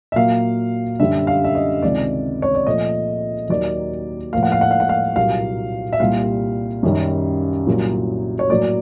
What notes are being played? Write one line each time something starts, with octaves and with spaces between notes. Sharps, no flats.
E5
A#2 F#3 A#3 F5
F#2 D3 G3 E5
F5
E5
D#5
C#2 C3 D#3 D5
C#5
D5
A#2 F3 A3 D#5
D#2 D#3 F#3 A#3 D5
A2 F3 A#3 F5
F#5
F5
F#5
F5
F#5
F5
C2 A#2 F#3 A#3 F5
E5
C2 A#2 G3 F5
F#2 D#3 G3
C2 A#2 F#3 A#3
C#5
A2 F#3 A#3 D5